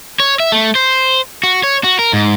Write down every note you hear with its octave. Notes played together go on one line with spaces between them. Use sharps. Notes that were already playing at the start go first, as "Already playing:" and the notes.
C#5
E5
A3
C5
F#4
C#5
F#4
A#4
G#2